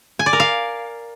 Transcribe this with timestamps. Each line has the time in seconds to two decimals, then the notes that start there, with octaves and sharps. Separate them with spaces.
0.19 G#5
0.26 D5
0.33 A#4
0.40 F5